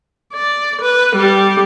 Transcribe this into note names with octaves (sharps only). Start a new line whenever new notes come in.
D5
B4
G3 G4